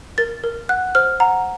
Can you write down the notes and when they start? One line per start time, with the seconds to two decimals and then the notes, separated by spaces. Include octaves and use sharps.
0.18 A#4 A6
0.44 A#4
0.69 F#5 F#6
0.95 C5 F6
1.20 F#5 A#5